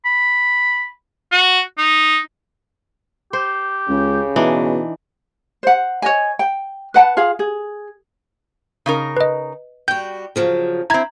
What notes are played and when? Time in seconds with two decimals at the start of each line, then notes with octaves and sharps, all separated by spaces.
0.05 B5
1.32 F#4
1.78 D#4
3.33 G4 C5
3.89 C#2 C#3
4.36 B2 E3 D4 D#4
5.63 C5 F#5
6.02 C#5 D#5 G#5
6.39 G5
6.94 B4 F#5 A5
7.17 F4 G#4 F5
7.39 G#4
8.86 C#3 D#4 A#4
9.17 B4 D#5
9.88 G3 F#4 G5 G6
10.36 C#3 F3 F#3
10.90 C4 E4 A#5 G#6